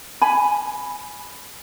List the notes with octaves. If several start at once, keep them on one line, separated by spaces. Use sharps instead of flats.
G#5 B5